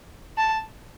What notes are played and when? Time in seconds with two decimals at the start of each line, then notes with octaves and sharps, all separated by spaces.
0.37 A5